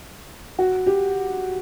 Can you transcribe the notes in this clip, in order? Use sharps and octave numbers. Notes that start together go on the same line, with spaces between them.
F#4
G4